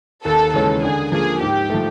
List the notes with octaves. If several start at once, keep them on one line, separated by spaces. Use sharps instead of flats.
D#2 A4
C#3 E3 G#3 C#4 A4
D3 G#4
F3 A#3 G#4
G#2 G4
F3 A3